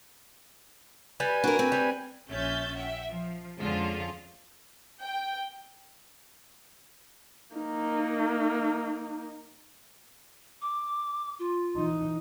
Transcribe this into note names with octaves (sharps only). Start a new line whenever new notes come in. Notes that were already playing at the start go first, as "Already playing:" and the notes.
G3 B4 G#5
D4 F#4 A#4
C4
G3
A#1 C#4 E5 G6 A6
E5 F#5 G5
F3
F2 D3 F3 G#3 C#4 F4
G5
A#3 D#4
D6
F4
E3 D#4